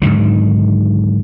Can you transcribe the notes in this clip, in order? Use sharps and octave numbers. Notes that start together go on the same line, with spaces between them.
G#2 D3 D#3 F#3